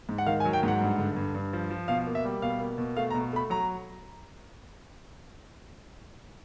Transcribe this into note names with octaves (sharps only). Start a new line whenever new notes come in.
G#2
F#5
D#3 F5
G#5
F#3
G5
G#2 F#5
G2
D3
G2
G2
F3
F3
B2 F5
A#3
E5
G3
B2 F5
A#3
B2
A3 F5
A#5
B2
A3 B5
F#3 A#5